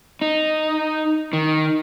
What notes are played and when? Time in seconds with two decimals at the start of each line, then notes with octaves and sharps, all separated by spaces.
0.22 D#4
1.33 D#3